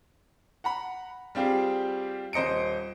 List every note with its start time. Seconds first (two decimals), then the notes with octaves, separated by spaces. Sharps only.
0.64 F#5 A#5 B5
1.35 G3 C4 F4 G4 G#4
2.33 D#1 C5 D#5 C#7 D7